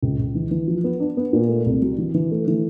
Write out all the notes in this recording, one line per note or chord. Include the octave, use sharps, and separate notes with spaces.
C#2
C#2
E3
E3
F3
B3
D4
B3
A#2
A3
C2
F#3
E3
E3
A3
E3